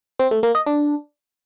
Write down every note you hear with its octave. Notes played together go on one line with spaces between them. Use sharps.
C4
A3
A#3
D#5
D4